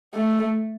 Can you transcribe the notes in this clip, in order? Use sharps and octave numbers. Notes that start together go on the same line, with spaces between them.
A3